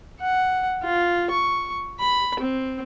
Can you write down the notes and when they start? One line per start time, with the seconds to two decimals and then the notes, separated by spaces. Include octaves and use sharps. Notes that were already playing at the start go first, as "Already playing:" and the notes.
0.20 F#5
0.83 F4
1.31 C#6
2.00 B5
2.40 C4